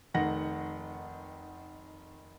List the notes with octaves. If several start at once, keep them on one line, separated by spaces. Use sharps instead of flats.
F1 D#3 F#5 A#6